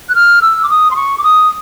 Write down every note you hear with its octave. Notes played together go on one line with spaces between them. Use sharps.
F#6
F6
E6
D6
D#6
C6
C#6
D6
D#6